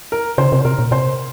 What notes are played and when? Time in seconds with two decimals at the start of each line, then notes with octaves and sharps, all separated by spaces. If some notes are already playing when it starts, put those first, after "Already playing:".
0.12 A#4
0.38 C#3 C5
0.52 C3
0.61 C5
0.65 C3 A#4
0.78 A#2
0.91 C3 C5